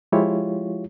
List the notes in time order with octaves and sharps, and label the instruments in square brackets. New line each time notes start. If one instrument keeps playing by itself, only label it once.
[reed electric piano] F3 G#3 E4 F4 G4 C#5